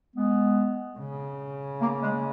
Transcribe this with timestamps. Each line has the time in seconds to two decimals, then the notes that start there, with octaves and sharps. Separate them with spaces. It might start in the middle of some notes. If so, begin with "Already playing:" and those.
0.16 G#3 B3
0.99 C#3
1.81 A#3
2.02 G#3